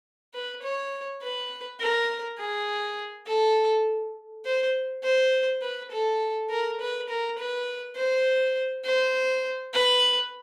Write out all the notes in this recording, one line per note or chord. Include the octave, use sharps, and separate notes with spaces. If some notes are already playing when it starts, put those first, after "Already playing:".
B4
C#5
B4
A#4
G#4
A4
C5
C5
B4
A4
A#4
B4
A#4
B4
C5
C5
B4